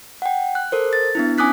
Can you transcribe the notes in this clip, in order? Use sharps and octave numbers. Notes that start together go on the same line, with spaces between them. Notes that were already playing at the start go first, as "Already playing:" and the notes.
F#5 G5
F#6
A4 A#4 C5
A6
B3 D4 E4
C#4 G#5 D6 D#6 F#6 B6